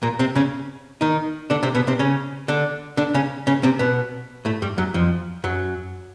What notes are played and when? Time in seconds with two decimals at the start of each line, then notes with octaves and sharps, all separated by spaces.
0.03 A#2 A#3
0.19 C3 C4
0.36 C#3 C#4
1.01 D#3 D#4
1.50 D3 D4
1.63 C3 C4
1.75 B2 B3
1.87 C3 C4
1.99 C#3 C#4
2.48 D3 D4
2.97 D3 D4
3.14 C#3 C#4
3.47 C#3 C#4
3.63 C3 C4
3.79 B2 B3
4.45 A2 A3
4.62 G2 G3
4.78 F#2 F#3
4.94 F2 F3
5.44 F#2 F#3